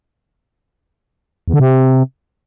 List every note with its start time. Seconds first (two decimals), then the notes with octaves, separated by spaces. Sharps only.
1.48 E2
1.54 D3
1.60 C3